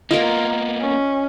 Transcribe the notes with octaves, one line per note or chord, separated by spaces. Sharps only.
A#3 B3 F4 A#4 D#5
C#4